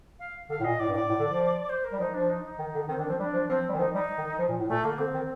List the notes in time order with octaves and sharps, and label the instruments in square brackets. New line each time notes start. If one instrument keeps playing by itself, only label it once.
[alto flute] F5
[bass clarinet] D3 [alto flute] F5
[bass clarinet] A2
[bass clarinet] A#2 [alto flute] D#5
[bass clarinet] A2 [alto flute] D5
[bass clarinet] G2
[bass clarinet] A2 [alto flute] D5
[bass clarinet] A2
D3
F3
[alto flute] C5
A#4
[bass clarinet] G3
[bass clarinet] F3 [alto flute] D#4
[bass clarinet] F3 [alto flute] D4
[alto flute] D#4
D#4
[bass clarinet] D#3
D3
[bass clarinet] D#3 [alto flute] C4
[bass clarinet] D#3 [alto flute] D4
[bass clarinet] F3 [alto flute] C4
[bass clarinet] G3 [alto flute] D4
[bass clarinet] F3
[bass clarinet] F3 [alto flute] C4
[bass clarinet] G3
D#3
[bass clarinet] F3 [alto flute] D#4
[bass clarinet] G3 [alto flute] D#4
[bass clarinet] D#3
F3
A#2
A2
[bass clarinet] A#2 [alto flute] A3
[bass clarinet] D3 [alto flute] A#3
[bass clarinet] D3 [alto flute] C4
[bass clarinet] D#3